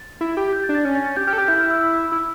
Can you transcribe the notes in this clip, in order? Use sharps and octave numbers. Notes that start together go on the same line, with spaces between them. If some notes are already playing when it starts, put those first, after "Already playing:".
Already playing: A6
E4
G4
G6
A6
D4
A6
C#4 A6
A6
A6
G4 G6
G4 F6
A4
G4 G6
E4 G6
F6
E6
E6
E6
E4 E6